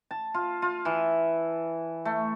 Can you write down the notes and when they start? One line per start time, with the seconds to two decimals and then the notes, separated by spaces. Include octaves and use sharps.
0.11 A5
0.34 F4
0.62 F4
0.85 E3
2.05 A3